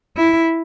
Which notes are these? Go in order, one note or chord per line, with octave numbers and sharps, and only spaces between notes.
E4